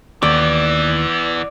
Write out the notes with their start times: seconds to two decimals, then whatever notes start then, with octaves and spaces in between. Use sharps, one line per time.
0.22 D#2 E3 B3 D5